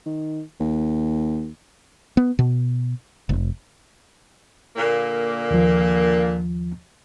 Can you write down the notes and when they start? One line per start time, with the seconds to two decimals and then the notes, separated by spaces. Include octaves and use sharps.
0.06 D#3
0.60 D#2
2.17 B3
2.39 B2
3.29 F1
4.76 A#2 D3 A#3
5.51 D#2 F3